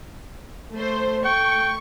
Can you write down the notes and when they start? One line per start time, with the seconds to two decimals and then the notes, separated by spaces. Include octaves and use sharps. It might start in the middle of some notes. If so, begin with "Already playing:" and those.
0.74 A3 C5
1.25 A3 G5 C#6